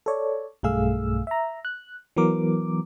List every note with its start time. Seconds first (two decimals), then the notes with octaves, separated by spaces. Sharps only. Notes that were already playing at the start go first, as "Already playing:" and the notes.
0.06 A4 C#5 D5
0.63 B1 G2 A3 G#4 F5 E6
1.27 E5 A#5
1.65 F#6
2.17 E3 F#3 B3 A#4 D6